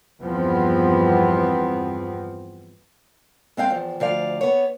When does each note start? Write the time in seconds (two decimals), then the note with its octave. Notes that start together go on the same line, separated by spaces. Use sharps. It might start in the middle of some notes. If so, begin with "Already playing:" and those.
0.23 E2 G2 F3 B3 C4
3.57 G#3 C4 F5 G5
3.70 E2 F3
4.00 D2 F3 D5 F5
4.41 B3 C#5